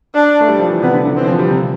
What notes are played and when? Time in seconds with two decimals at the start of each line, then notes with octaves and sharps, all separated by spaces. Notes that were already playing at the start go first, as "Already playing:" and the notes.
0.14 D4
0.41 A3
0.48 G3
0.59 F3
0.71 E3
0.82 C3 B3
0.94 D3
1.05 D3
1.16 E3 C4
1.28 F3
1.39 G3
1.50 C3